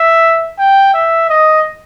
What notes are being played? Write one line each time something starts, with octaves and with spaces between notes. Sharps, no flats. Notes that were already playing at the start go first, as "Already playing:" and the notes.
Already playing: E5
G5
E5
D#5